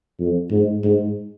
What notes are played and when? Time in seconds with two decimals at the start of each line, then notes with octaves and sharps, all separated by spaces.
0.20 F2
0.51 G#2
0.84 G#2